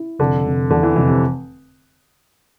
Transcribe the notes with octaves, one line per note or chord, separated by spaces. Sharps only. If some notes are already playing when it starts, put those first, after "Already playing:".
Already playing: E4
F1 D3
F1
E2 D3
E3
F1 E3
C3